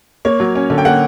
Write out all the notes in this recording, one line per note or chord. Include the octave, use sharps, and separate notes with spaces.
A#3 C#5
F#3
C#4
D3
G5
A#3 F#5